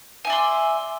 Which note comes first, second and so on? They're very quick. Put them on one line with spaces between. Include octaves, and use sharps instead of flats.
G#5 E5 D5 C6